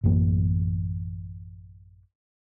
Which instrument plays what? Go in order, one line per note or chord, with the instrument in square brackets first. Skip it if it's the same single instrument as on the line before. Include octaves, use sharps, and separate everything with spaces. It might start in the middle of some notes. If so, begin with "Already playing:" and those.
[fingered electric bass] A1 F#2 E3 A#3